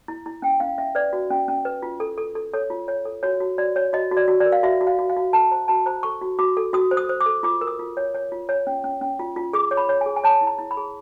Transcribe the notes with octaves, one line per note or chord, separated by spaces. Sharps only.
E4
E4
C#4 G5
C#4 F5
C#4 E5
B4 D5
F#4
C#4
C#4
B4
F4
A4
A4
A4
A4 C#5
F4
C#5
A4
F#4 C#5
F#4
F#4 D5
C#5
F#4 D#5
F#4
D5
F#4
D5
A#4
F5
F#4 E5
F#4
F5
F#4
F5
F#4
A4 A5
C5 A#5
F#4 A5
C5 A#5
A4 C#6
F#4
F#4 D6
A4
F#4 D#6
C5
D#6
C5
D6
A4
F4 D6
A#4
D#6
F4
C#5
C#5
F4
C#5
C#4
C#4
C#4
F4
F4
G#4 D6
C#5
B5
C#5
G#4 G#5
G#5
C#5 A5
E4
A#5
E4
B5
G#4